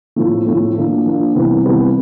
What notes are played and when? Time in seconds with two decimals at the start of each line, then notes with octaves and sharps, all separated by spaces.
0.16 A2 F3 A3
0.47 A2 F3 A3
0.76 F3 A#3 D4 F4
1.06 F3 A#3 D4 F4
1.35 C3 E3 G3 B3
1.65 C3 E3 G3 B3